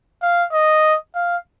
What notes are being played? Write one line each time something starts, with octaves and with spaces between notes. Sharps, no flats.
F5
D#5
F5